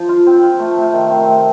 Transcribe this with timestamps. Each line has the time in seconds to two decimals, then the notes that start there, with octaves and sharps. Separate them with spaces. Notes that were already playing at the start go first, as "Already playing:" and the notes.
Already playing: F3
0.09 F4
0.27 C4
0.43 F4
0.59 A3
0.77 C3
0.93 D#3
1.10 C4
1.28 A3